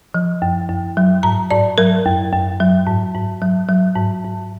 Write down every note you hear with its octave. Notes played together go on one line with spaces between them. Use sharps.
F3
F#2
F#2
F#3
G#2 A#5
G#2 D5
F#3 A#4
F#2
F#2
F#3
G#2
G#2
F#3
F#3
G#2
G#2